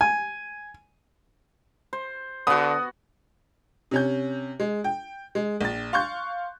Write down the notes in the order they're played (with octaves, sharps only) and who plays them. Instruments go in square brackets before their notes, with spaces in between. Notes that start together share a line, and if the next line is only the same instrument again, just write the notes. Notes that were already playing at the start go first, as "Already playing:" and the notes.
[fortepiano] G#5
[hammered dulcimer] C5
[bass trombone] D3 [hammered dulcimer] B3 F#4 [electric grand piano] D#6
[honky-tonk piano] C3 C#4 G6
G#3
G5
G#3
A#1 A6
F5 C6 C#6 F#6 G6